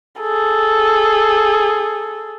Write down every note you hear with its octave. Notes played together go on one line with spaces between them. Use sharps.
G#4 A4